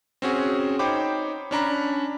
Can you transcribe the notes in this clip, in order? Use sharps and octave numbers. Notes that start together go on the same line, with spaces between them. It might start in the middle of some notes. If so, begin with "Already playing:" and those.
C4 C#4 F#4 G#4
D#4 C5 C#5 G5 B5 D6
C#4 D4 A#5 B5